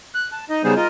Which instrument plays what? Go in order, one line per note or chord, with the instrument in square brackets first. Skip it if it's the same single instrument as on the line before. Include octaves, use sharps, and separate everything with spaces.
[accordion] F#6
A5
D#4 D#5
C#3 G3 B3 D#4 G#4 C5
F4 A#4 D#5